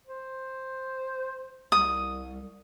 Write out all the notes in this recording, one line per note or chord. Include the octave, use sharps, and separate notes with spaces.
C5
C2 D#6